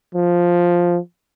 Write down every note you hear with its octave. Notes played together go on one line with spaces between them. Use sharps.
F3